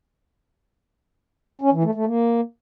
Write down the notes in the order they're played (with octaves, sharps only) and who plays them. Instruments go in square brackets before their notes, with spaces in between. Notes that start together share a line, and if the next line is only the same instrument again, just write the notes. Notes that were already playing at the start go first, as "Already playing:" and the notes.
[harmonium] C#4
E3
A3
A3
A#3